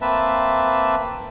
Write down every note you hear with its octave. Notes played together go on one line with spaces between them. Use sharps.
A#3 C4 B4 E5 A5